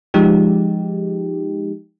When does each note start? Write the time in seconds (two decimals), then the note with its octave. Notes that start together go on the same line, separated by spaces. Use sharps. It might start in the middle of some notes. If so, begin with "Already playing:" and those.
0.14 F3 G#3 D#4 G4